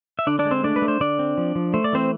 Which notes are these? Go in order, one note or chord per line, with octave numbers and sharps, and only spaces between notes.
E5
D3 D4 D5
D4 D5
G#3
C4 C5
A3 D4 D5
B4
A3
C5
D3 D4 D5
C4
F3
F3
A3 C5
D5
E3 C4 C5